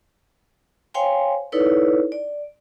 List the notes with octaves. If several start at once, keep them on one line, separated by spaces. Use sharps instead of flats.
C5 C#5 F5 G5 G#5 C6
D#4 E4 A4 B4 C#5 D5
D5